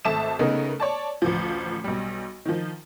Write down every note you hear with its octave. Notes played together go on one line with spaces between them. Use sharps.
G#1 A3 E5 A5 D#6 E7
C#3 A3 B3 D#4 A#4
C#5 D5 A5
A1 D2 F3
B1 G3
D#3 F3